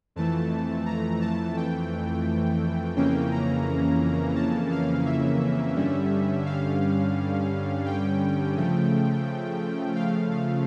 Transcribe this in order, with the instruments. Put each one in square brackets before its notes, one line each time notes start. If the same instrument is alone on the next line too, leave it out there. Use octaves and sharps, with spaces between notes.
[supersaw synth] F2 E3 A3 A5
A#5
A5
G5
F2 C#3 E3 A#3 C#4 G5
A#5
A5
F5
E5
G2 D3 G3 C#4
F5
G5
C#3 F3 A3
F5
F5